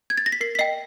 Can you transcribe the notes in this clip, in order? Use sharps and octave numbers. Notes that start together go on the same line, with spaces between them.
G#6
A6
A#6
B6
A#4 C7
B6
D#5 G5 C7